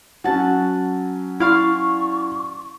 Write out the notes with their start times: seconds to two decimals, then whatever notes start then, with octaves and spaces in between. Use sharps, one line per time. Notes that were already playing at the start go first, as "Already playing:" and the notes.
0.24 F#3 C#4 F#5 A5
1.40 E4 D5 F5 C6 C#6